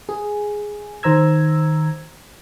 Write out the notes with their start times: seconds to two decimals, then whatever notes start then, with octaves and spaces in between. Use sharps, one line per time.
0.09 G#4
1.03 D#3 C5 A#5 E6 G#6